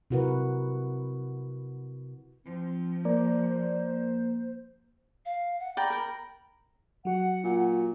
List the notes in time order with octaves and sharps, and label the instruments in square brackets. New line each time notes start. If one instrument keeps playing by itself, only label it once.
[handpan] C3 E4 F#4 A#4 B4 F#5
[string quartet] F3 [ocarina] C4
[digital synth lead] A#3 [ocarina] C5 [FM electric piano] D5
[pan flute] F5
F#5
[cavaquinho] D5 G5 A#5 [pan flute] B5
[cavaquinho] A#4 G5
[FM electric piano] F#3 F#4 [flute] F#5
[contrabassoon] A#2